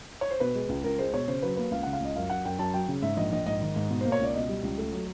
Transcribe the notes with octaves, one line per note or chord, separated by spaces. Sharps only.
C#5
C5
B2 B4
G#3
C#2
C#2 A#4
G#3 C5
B2 C#5
C#3 C5
F#3 B4
A#3 B4
C#2 F5
C#3 F#5
F5
C#2 D#5
F#2 F5
F#2 F#5
F#2 G5
F#2 A5
F#3 G5
C#3
G#2 E5
A#1 D#5
A#1 D#5
G#2 D#5
D#3
G#2
B2
A#3 C5
C#5
C#2 D5
B2 D#5
G3
C#2
A3
F#3